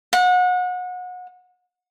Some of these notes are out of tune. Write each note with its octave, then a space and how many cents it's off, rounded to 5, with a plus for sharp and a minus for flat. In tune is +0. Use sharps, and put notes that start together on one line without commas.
F#5 -30